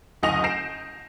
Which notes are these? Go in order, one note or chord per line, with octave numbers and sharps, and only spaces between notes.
F#1 D2 D#5 G#5 A#6 F7
G6 A#6 C7 D7 E7